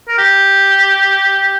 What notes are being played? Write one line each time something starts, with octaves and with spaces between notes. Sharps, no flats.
A#4
G4